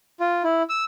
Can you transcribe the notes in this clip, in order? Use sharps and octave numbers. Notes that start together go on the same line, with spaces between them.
F4
E4
E6